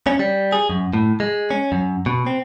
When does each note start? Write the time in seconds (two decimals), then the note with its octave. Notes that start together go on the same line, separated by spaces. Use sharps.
0.07 C#4
0.19 G3
0.52 G#4
0.70 F#2
0.93 A2
1.20 G#3
1.51 C#4
1.72 F#2
2.06 B2
2.27 C4